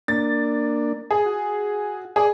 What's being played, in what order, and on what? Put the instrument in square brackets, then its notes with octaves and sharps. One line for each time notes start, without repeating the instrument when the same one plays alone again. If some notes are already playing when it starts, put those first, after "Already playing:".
[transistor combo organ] A#3 D4 [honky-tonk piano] A6
[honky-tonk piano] G#4
[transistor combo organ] F#4
[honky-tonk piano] G#4 [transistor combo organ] D5